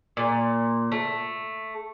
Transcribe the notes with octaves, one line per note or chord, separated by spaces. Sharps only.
A#2
A3